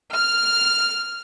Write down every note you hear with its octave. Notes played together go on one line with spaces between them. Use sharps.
F6